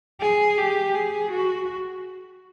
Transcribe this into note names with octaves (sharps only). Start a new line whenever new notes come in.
G#4
G4
G#4
F#4